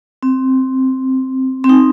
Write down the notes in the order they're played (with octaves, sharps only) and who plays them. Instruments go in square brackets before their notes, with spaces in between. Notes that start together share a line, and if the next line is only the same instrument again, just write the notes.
[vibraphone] C4
C4
D#4